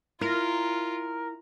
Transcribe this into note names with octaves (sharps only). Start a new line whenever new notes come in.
E4 F4 A#4